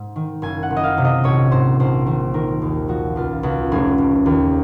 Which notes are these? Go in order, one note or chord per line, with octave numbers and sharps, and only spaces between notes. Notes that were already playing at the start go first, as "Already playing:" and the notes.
Already playing: G#2
D#3
F#1 G#5
F#5
F#1
D#5
F5
C3
D#5
A#1 C#5
G#2 C5
A#1 C5
D#3 C5
D#3 A#4
D#2
F3 F#4
C#2 F4
C#2 F#4
F1 G#4
F1
D#2